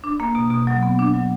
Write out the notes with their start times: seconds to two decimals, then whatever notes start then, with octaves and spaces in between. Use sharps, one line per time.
0.04 D4
0.20 A#3
0.35 B2
0.51 B2
0.67 F#3
0.83 B3
0.99 D4
1.14 F#3